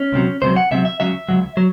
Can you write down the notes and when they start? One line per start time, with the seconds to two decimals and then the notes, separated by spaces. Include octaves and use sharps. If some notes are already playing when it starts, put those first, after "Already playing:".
Already playing: C#4
0.13 C#2 C3 F#3
0.42 C#2 C3 F#3 C5
0.56 F#5
0.71 C#2 C3 F#3 E5
0.85 E5
1.00 C#2 C#3 F#3 E5
1.29 C#2 C#3 F#3
1.57 F#3